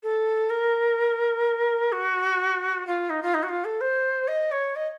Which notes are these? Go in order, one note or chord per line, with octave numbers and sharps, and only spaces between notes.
A4
A#4
F#4
F4
D#4
F4
D#4
F#4
F4
A4
C5
D#5
C#5
D#5